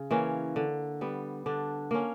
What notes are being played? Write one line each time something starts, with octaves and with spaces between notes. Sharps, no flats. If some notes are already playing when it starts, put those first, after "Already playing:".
Already playing: C#3
E3 A#3 C#4
D3
G3 B3
D3 D4
A#3 C#4